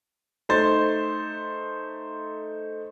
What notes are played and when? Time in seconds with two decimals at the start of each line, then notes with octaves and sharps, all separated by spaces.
0.49 A3 D#4 C5 C6 A6